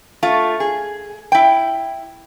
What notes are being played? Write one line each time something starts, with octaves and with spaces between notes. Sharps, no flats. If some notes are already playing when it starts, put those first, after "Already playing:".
A3 F4
G#4
E4 G5